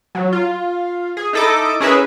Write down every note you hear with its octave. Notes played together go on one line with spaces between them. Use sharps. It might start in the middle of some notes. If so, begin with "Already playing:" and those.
F#3
F4
G#4
D#4 E4 A4 D#5 D6
C#4 E4 G#4 A#4 B4 E5